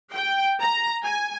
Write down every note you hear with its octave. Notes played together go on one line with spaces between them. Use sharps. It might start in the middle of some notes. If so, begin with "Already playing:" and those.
G5
A#5
G#5